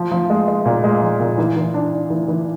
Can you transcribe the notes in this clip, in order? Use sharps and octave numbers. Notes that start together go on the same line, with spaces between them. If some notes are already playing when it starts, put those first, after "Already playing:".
Already playing: F3
F3
G#3
G#3
A#2
G#3
F3
A#2
E3
E3
D4
D4
E3
E3